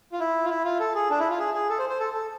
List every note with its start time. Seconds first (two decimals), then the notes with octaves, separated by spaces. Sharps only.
0.12 F4
0.19 E4
0.44 F4
0.49 E4
0.64 F4
0.80 A4
0.95 G#4
1.10 D4
1.19 E4
1.30 F4
1.40 G#4
1.54 G#4
1.69 A4
1.79 C5
1.89 C5
1.99 A4
2.13 A4